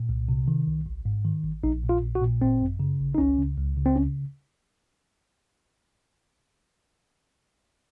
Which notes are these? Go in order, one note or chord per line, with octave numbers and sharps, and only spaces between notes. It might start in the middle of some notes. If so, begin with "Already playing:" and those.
Already playing: A#2
C2
C3
D#3
C2
G#1
G#2
D#3
G#1
A#1 D#4
A#2
F4
A#1
F#4
A#2
G#1 C4
F#2
C#3
G#1
D#4
C#2 C#4
C#3
C#2
C#3
C4
C#4